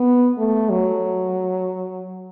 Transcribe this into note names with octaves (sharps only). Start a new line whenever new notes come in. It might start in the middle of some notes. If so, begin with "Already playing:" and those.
Already playing: B3
A3
F#3